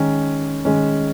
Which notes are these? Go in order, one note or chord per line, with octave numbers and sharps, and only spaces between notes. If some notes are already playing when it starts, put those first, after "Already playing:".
Already playing: D#3 G#3 C#4
D#3 G#3 C#4